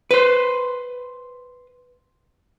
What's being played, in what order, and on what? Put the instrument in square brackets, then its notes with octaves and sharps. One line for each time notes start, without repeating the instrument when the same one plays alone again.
[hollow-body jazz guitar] B4 C5